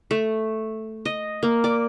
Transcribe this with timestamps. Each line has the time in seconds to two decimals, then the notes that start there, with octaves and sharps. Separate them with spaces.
0.11 A3
1.05 D#5
1.43 A#3
1.64 D5